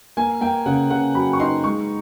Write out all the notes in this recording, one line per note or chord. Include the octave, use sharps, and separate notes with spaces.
A#3 G#5
A#3 G5
C#3 F#5
C#3 F#5
F#3 B5
C#6
D#4 C6
G#3 C#6